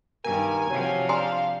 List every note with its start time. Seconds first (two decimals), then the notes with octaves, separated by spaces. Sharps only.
0.24 G2 D#3 A#4 G#5
0.70 C3 F3 F#3
1.09 D4 F5 G#5 A#5 C6